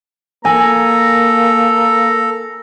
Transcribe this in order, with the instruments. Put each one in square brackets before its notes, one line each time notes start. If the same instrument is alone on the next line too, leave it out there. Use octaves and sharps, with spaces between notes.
[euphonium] A#3 [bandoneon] A4 [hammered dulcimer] G#5 [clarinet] A#5